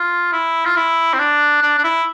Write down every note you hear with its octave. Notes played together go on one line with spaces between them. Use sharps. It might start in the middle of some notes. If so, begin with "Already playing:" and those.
Already playing: F4
E4
F4
E4
C4
D4
D4
D4
E4